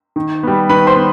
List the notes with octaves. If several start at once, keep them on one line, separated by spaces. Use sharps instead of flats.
D#3
G3 B3
D#3 B4 B5
C5 C6
B3